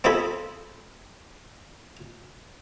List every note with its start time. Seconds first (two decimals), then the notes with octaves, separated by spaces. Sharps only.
0.04 C4 D#4 F4 G#4 A4 B5